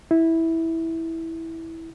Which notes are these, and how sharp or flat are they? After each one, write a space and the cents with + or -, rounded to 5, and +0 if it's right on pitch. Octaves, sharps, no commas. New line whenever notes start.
E4 -10